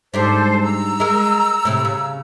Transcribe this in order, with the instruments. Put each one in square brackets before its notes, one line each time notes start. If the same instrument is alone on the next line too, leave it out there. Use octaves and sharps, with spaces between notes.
[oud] G#2 G3 D4 [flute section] A4 C5
[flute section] A#5 E6
[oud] G#3 A#4
A2 C3
C#3